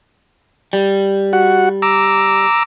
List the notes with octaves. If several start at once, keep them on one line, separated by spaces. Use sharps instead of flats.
G3
F#4 F#5
A#5 D6 E6